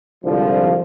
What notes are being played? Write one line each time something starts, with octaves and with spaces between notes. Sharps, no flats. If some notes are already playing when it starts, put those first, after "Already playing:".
C2 G#2 D3 F3